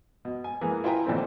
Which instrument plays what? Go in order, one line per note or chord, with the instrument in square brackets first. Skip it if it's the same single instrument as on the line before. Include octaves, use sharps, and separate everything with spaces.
[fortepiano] B2
G#5
E3 A#3 B3 G#4
E4 F4 B4 G5 G#5 A#5
G#1 A#2 A3 C4